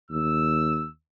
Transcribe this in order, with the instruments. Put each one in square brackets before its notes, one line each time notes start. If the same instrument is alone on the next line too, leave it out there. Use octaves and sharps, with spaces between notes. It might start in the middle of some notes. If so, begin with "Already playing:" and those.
[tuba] D#2 [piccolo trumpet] E6